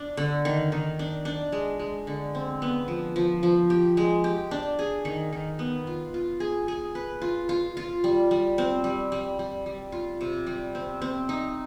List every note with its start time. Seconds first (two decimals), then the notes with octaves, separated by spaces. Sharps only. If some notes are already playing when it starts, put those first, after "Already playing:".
Already playing: D4
0.17 D3
0.45 D#3
0.72 D#3
0.99 D4
1.25 D4
1.52 G#3
1.79 G#3
2.07 D3
2.35 C4
2.62 B3
2.88 F3
3.16 F3
3.43 F3
3.70 G4
3.97 G#3
4.24 G4
4.51 D4
4.79 G#4
5.05 D#3
5.33 D#3
5.59 B3
5.87 F4
6.14 F4
6.40 G#4
6.68 G#4
6.95 B4
7.22 F4
7.49 F4
7.77 F4
8.04 G3
8.31 G3
8.58 C4
8.84 G3
9.12 G3
9.39 G3
9.66 G3
9.92 F4
10.21 C3
10.47 G3
10.75 C4
11.02 C4
11.29 D#4